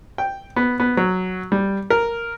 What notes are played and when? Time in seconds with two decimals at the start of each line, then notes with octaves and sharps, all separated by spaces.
0.18 G5
0.56 B3
0.80 B3
0.97 F#3
1.52 G3
1.90 A#4